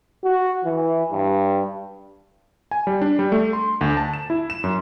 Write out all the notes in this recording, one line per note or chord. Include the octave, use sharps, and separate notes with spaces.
F#4
E3
G2
G#5
G3
D4
G3
A3
C6
D2
A5
E7
E4
E7
F#2